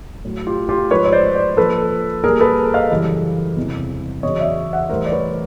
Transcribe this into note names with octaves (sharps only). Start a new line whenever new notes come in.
A2 F#3
F4 G4
F4 G4
G#2 F3 B4 C#5
C#5
C5 D5
C5 D5
A#2 F3 A4 B4
A#2 G3 G#4 A#4
A4 B4
D#5 F5
F#2 C#3 E3 G3
E2 C3 E3 G3
E2 C#3 F#3 C#5 D#5
D5 E5
E5 F#5
A2 E3 G3 A#4 C5
D5
B4 C#5